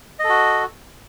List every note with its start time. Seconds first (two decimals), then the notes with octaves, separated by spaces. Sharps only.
0.19 D#5
0.24 A4
0.29 F#4